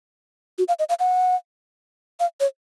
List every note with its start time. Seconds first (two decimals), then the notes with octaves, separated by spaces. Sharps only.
0.58 F#4
0.68 F5
0.79 D#5
0.89 F5
0.99 F#5
2.20 F5
2.40 C#5